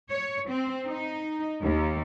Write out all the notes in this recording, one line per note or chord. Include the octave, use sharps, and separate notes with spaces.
C#5
C4
D#4
D#2